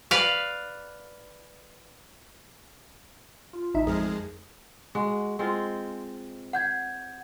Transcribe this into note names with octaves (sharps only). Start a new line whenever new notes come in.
B4 D5 F5
F4
A1 D#4 E5
F2 G#3 G#4 A#4
G#3 F#4
G#3 C4 F4
F#5 G6 G#6